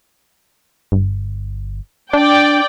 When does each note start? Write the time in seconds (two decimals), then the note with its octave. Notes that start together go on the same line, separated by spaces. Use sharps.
0.92 G1
2.13 D4 D5 G5